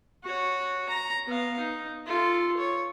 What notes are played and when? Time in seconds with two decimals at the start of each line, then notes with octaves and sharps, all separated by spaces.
0.24 F#4 C#5
0.89 A#5
1.27 B3 F5
1.59 D#4
2.07 F4 A4
2.57 C#5